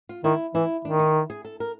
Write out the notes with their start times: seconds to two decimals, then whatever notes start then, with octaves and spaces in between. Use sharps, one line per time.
0.09 F4
0.24 D#3 E4
0.54 E3 E4
0.85 D#3 D4
0.99 D#4
1.30 G#4
1.45 A4
1.60 A#4